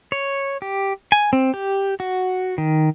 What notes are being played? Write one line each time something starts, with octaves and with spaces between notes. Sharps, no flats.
C#5
G4
G#5
C4
G4
F#4
D#3